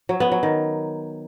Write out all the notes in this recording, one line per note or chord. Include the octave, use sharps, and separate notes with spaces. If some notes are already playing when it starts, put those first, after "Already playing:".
F#3
B3
F#3
D#3